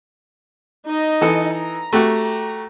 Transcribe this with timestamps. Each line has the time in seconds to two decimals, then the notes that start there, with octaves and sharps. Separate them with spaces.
0.86 D#4 D#5
1.21 E3 A4 D#6
1.55 A#5
1.93 A3 F#4 G4